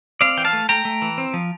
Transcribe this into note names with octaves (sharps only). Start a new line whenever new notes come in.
C4 D5 F5
E3 G5
F5 A5
A3
A3 G5 A#5
A3
E3
C4
F3